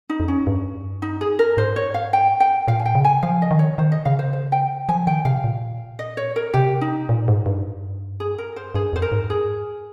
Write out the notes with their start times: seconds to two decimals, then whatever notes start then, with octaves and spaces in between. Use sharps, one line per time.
0.09 D#4
0.20 F2
0.28 C#4
0.47 G2
1.02 D#4
1.21 G#4
1.39 A#4
1.57 G#2 C5
1.76 C#5
1.94 F5
2.13 G5
2.40 G5
2.68 A#2 F5
2.79 G#5
2.86 G5
2.95 C#3
3.04 G#5
3.22 F3 F5
3.42 D#5
3.51 D#3
3.59 C#5
3.78 D#3 C5
3.92 D#5
4.05 C#3 F5
4.19 C5
4.33 C5
4.52 G5
4.89 F3 G#5
5.07 D#3 G5
5.25 C3 F5
5.44 A#2
5.99 D#5
6.17 C#5
6.36 A#4
6.54 C3 G4
6.81 D#4
7.09 A#2
7.28 G#2
7.46 G2
8.20 G#4
8.38 A#4
8.56 C5
8.74 G2 G#4
8.93 F2 C5
9.02 A#4
9.12 G#2
9.30 G#4